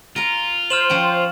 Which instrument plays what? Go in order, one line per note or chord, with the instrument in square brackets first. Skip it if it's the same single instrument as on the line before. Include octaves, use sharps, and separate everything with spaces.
[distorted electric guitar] F4 [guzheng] A#4 A#5
[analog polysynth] C5 [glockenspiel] F6 E7 F#7
[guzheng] F3 C#4 G5